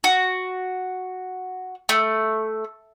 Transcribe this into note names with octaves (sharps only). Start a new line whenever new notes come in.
F#4
A3